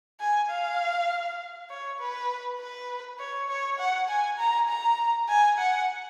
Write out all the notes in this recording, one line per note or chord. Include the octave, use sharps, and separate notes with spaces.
G#5
F5
C#5
B4
B4
C#5
C#5
F#5
G#5
A#5
A#5
G#5
F#5